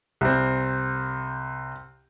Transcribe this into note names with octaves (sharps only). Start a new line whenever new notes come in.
C2 C4